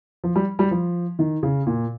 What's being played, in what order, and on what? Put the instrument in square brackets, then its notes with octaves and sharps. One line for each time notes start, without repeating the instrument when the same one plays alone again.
[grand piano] F3
G3
G3
F3
D#3
C#3
A#2